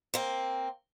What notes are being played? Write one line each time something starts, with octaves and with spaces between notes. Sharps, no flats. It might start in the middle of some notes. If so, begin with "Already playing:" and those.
A#3 C4